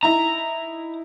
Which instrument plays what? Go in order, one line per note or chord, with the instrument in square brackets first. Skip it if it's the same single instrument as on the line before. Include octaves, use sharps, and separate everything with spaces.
[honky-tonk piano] D#4 E4 [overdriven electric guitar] A#5